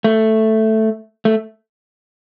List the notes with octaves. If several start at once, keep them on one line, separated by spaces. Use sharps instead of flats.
A3
A3